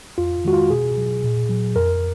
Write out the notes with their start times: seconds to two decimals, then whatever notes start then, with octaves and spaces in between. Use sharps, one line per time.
0.18 F2 F4
0.45 D#3 G#3 F#4
0.53 F4
0.70 B2 G#4
0.97 F#3
1.24 A#2
1.49 F#3
1.76 F2 A#4